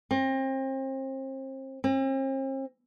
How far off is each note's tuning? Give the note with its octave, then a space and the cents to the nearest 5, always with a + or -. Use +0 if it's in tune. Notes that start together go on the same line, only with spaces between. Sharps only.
C4 +35
C4 +45